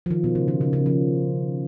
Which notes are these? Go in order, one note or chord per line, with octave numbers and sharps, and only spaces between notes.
F3
D#3
B2
C#3
D#3
C#3
C#3
F3